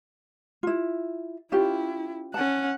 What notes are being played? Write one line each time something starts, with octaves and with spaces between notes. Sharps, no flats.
E4 F4
C#4 E4 F4 G4
C#4 F#5 A5